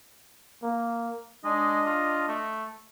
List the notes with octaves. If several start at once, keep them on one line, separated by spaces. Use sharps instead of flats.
A#3
G#3 D4 D#5
F4
A3